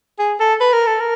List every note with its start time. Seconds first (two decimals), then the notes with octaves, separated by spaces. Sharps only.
0.18 G#4
0.40 A4
0.60 B4
0.73 A#4
0.87 A4
1.00 A#4